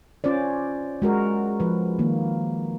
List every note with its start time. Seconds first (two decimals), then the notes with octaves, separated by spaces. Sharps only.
0.24 C#4 F4 C5 D5
1.02 G#3 F#4 A#4
1.60 F3 B4
1.99 D#3 A#3